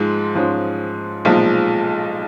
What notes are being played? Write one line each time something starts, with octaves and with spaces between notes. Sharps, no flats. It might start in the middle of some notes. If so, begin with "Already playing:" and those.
Already playing: G#2 F3 G#3
G#2 F3 G#3 C#4
B1 A#2 F3 G#3